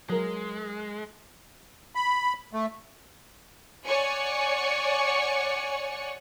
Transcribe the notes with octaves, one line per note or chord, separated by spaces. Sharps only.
F#3 G#3 A#4
B5
A3
C#5 D5 F#5 G#5 C#6